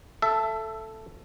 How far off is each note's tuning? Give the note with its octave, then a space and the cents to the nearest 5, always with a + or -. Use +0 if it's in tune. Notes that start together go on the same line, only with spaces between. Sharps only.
A4 +0 E5 +20